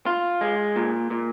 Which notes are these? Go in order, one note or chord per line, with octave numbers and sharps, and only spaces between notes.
F4
G#3
A#2
A#2